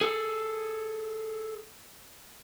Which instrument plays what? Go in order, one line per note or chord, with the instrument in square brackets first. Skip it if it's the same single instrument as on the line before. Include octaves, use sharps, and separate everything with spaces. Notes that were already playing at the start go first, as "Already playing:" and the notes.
[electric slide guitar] G#4 A4